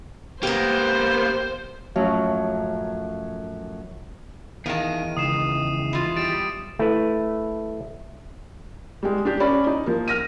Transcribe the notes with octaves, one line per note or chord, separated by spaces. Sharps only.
A#3 B3 G4 A#4 C5
F#2 A2 F3 F#3 C#4
E2 D#3 D#4 A#4 F5 A5 D#7
C#2 D#6 C7 E7
E3 F4
G3 A6 D7 E7
A3 E4 B4
G3 G#3
D4 G4
C#4 D5 B5
D#4
F3 A#3
F6 A#6 D#7